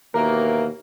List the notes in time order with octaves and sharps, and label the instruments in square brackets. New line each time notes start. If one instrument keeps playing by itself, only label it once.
[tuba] D#2 [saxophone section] B2 E3 A#3 [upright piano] A#4